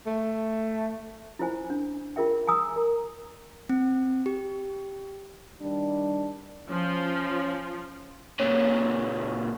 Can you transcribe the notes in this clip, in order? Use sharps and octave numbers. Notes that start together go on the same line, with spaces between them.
A3
E4 F4 C5 G#5
D4
F4 G#4 A#4 E5 G5
G#5 A#5 D#6 E6
A#4 A#5
C4
G4
D#3 G3 D4
F3 C#4
A#2 C#3 C#5